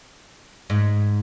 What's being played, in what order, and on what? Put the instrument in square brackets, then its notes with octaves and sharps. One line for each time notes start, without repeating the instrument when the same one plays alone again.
[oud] G#2